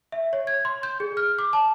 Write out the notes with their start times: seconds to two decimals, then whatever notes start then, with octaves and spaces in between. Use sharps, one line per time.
0.12 E5
0.33 C#5
0.47 G#6
0.65 C6
0.83 G6
1.00 G#4
1.17 F6
1.39 D6
1.53 A5